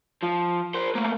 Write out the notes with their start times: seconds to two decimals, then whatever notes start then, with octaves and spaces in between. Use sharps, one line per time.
0.23 F3
0.74 A#4 C5
0.95 A3 A#3